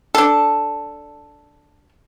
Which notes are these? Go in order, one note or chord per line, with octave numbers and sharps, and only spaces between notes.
D4 A4